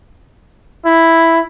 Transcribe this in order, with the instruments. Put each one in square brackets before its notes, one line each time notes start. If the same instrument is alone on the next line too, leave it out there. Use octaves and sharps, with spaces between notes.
[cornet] E4